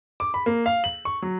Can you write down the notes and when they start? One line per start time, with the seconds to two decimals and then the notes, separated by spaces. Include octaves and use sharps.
0.20 D6
0.34 B5
0.46 A#3
0.66 F5
0.84 F#7
1.05 C#6
1.22 F#3